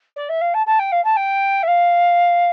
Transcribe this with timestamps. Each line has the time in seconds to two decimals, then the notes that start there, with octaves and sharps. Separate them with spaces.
0.16 D5
0.29 E5
0.41 F5
0.54 A5
0.66 A5
0.79 G5
0.92 F5
1.04 A5
1.16 G5
1.63 E5
1.67 F5